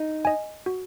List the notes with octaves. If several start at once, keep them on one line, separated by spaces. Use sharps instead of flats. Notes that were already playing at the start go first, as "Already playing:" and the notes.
Already playing: D#4
D#5 G#5
F#4